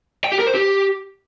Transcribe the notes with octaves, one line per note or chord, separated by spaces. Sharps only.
G5
G4
A#4
C5
G4